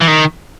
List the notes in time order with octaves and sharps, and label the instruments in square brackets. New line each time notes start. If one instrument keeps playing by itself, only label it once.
[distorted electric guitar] E3
D#3